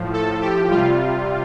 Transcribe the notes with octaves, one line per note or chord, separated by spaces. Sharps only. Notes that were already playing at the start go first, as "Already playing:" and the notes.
Already playing: A2 F3
A4
G4
C3 G3 F4